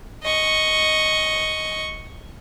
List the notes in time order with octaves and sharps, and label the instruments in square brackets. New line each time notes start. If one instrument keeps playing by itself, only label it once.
[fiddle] D#5 C#6